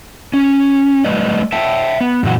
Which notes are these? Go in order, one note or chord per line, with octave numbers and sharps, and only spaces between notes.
C#4
G3 A3 B4 D5 D#5
E5 G5 A5
B3
F#2 A#2 E3 F#4